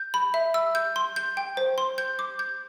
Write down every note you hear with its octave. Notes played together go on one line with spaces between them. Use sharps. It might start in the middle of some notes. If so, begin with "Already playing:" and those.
Already playing: G6
B5
E5
E6
G6
C6
G6
G5
C5
C6
G6
D6
G6